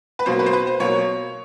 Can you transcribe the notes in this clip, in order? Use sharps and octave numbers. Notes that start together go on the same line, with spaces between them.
B4
B2 F#3 A#3 C5
B4
C5
B4
C5
B2 F#3 A#3 C#5